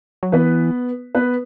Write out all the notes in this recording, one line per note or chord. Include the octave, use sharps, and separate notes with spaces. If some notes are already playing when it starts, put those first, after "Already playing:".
F#3
E3 B3 B4
B3 B4